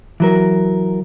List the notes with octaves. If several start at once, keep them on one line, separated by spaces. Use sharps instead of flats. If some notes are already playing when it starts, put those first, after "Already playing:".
E3 F#3 A#4